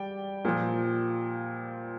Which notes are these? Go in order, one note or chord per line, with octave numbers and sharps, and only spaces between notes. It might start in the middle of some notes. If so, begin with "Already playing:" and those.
Already playing: G3 D5 G5
A#2 F3